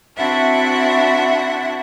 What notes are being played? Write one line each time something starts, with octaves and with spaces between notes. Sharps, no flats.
C4 D4 E4 F#4 E5 F#5